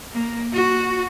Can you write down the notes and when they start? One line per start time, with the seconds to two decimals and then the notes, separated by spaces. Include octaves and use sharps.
0.12 A#3
0.53 F#4